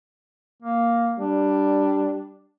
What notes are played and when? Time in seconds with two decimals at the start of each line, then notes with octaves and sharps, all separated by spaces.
0.62 A#3
1.19 G3 D4